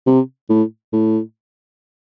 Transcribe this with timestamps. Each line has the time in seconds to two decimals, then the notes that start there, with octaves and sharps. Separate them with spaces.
0.06 C3
0.49 A2
0.93 A2